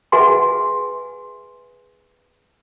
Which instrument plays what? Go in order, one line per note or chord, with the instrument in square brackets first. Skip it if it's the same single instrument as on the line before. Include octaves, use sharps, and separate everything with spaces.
[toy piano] G#4 B4 E5 F#5 G#5 C6